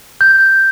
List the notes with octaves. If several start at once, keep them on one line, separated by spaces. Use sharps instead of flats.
G6